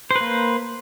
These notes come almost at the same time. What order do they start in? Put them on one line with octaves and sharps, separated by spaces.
C5 B4 A#3